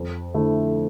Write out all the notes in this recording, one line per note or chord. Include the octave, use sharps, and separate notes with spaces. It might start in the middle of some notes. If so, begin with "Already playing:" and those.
Already playing: F2
D3 A3 E4